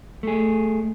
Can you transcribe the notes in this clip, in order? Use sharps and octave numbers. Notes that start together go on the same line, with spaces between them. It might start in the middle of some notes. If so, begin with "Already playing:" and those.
A3 G#4